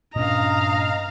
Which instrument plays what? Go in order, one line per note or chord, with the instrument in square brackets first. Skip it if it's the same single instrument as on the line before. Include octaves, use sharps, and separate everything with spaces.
[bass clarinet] G2 [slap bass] A#2 C#4 [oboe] D#5 [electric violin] F5 A#5